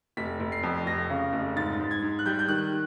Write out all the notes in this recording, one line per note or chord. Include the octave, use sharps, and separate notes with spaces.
F1 B6
F1
C7
F2
F1 A#6
C#3
F1
G#2 A6
G#2
G#6
G#2
F#6
G3 G6
G6
D#3 F#6